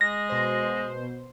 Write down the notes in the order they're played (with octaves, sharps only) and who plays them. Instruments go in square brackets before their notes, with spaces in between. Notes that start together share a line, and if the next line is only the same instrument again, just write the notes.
[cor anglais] G#3 [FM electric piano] A#6
[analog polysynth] B2 C5